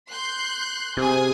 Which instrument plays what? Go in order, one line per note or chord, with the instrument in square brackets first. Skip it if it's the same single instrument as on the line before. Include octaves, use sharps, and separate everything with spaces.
[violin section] C6 F#6 G6
[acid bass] C3 [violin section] G#4 G#5 D#6